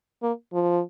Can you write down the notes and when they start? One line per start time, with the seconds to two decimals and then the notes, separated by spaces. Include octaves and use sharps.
0.22 A#3
0.53 F3